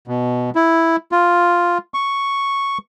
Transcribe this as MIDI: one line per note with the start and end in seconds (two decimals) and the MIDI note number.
0.08 0.50 47
0.55 0.96 64
1.12 1.78 65
1.94 2.78 85